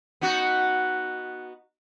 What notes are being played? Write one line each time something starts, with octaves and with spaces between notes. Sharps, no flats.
B3 D#4 F#4